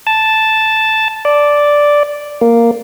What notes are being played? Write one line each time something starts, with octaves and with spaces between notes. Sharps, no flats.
A5
D5
A#3